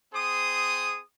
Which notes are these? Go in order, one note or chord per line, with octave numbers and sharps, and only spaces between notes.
C4 G#4 C5 D#6